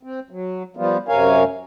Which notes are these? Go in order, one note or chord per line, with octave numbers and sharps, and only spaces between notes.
C4
F#3
F3 G3 B3 F4
F#2 C3 A#4 C#5 F5 G#5